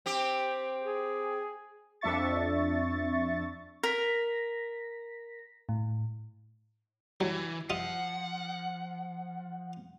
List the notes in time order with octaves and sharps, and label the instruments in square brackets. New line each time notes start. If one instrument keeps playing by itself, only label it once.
[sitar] C4 G4
[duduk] G#4
[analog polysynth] F2 D4 E5 C#6 A6
[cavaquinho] A#4 [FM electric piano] A#6 B6
[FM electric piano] A2
[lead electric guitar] E3 [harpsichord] F#3
[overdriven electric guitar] F3 [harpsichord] F4 E5 D#6 [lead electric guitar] F#5